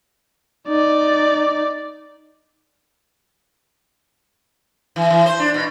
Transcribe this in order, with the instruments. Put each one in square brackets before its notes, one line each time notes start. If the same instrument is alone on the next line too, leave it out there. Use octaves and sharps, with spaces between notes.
[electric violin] D#4 D5
[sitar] E3
E3
C5
D4
B2